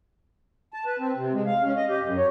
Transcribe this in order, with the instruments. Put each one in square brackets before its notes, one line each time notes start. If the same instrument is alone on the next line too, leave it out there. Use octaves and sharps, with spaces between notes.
[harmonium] A5
B4
C4
C3
G#3
F5
C#4
D#5
G4
F#2
C#5